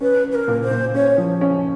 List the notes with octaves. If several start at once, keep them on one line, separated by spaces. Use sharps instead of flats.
C#4 B4
C#4
B4
A#4
A#2
C5
A#2
C#4 C#5
F3
C#4